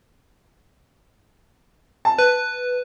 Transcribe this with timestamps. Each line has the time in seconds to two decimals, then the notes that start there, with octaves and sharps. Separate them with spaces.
2.05 A5
2.19 B4